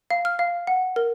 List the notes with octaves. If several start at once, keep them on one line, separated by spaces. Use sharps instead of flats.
F5
F6
F5
F#5
A#4